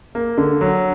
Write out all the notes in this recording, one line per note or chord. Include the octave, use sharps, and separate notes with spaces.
A#3
D3
F#3